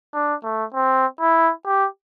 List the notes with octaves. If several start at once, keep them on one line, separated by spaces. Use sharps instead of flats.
D4
A3
C4
E4
G4